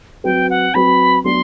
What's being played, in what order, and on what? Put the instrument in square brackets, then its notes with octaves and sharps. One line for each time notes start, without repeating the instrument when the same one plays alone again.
[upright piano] F#3 C4 F#4 B4 [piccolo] G5
[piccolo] F#5
[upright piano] F#3 C4 F#4 B4 [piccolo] B5
[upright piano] F#3 B3 D4 [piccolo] C6